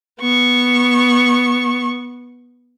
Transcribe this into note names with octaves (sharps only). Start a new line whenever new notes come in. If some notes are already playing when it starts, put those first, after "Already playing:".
B3 C#6